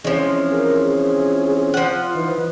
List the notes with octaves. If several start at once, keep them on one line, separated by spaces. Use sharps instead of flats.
E3 F3 G#3 C4 C#4 G#4
A#4
G#4
F3 F4 F#5
E3 D#4 B4